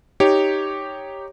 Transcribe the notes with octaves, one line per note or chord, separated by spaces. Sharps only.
D#4 G4 C#5